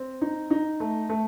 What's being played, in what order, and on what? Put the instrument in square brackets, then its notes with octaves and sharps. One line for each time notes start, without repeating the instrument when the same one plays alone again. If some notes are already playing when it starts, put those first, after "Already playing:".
Already playing: [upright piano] C4
D#4
D#4
A3
A3